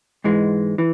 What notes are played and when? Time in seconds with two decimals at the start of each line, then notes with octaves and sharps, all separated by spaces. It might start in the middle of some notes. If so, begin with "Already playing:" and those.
0.24 G#2 E3 G#3
0.78 E3